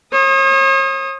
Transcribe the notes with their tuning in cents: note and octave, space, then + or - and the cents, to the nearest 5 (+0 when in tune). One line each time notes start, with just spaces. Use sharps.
C#5 -45 D#6 +0